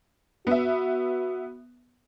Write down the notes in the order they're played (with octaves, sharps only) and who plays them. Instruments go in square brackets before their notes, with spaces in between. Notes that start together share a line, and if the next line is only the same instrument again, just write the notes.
[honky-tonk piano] B3 E5 [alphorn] F#4